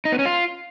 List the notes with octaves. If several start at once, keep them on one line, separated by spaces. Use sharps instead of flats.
D#4
B3
C#4
F4